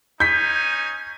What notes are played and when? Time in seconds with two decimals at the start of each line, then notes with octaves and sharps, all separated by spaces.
0.20 C#4 D#4 G#5 G6 B6